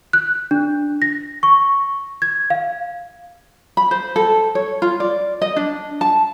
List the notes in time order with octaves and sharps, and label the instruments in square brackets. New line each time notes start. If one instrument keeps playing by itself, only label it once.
[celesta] F#6
D4
A#6
C#6
G#6
F5
[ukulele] B5
C5
A4
C#5
F4
D5
D#5
D4
A5